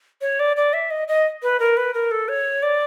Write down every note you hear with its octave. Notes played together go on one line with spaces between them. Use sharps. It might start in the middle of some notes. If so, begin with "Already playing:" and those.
C#5
D5
D5
E5
D#5
D#5
B4
A#4
B4
A#4
A4
C#5
D5